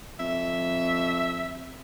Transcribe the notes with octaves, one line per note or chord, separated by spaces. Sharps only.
F2 E5